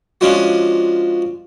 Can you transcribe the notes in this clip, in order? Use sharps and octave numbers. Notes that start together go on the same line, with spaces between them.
F3 G#3 C#4 D4 F4 F#4